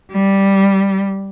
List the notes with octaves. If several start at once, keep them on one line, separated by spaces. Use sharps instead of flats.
G3